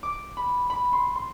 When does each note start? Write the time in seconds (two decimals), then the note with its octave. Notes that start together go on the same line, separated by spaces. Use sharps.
0.03 D6
0.37 B5
0.70 B5
0.93 C6
1.15 C6